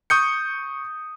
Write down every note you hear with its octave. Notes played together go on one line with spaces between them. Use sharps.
C#6 D#6 G6 C#7